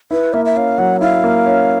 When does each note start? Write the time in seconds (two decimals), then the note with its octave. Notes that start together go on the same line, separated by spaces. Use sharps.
0.11 E4 B4
0.33 A#3 E5
0.45 E5
0.56 C#4 F5
0.78 F#3 F#5
1.01 E4 F5
1.24 A#3
1.46 C#4